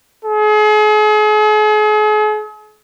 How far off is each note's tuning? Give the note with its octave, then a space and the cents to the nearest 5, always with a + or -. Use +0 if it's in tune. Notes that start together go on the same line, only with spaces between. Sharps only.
G#4 +40